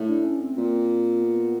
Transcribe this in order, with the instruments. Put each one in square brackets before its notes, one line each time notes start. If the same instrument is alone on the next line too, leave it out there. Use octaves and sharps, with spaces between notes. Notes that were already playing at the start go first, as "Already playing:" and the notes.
Already playing: [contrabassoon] A2
[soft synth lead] D4
C#4
C4
[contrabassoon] A#2 [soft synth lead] C4
[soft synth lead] B3